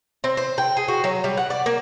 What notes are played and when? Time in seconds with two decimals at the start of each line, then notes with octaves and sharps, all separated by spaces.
0.24 C4
0.37 C5
0.58 G5
0.77 G#4
0.88 F#4
1.04 F#3
1.24 G3
1.37 F#5
1.50 D5
1.66 A#3